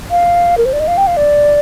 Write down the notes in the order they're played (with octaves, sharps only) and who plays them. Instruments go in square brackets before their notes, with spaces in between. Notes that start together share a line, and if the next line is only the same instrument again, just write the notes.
[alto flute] F5
A#4
C5
D5
D#5
F5
G5
F5
D5